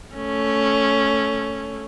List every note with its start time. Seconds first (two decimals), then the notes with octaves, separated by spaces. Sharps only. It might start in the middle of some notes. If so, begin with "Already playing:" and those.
0.15 A3 C#4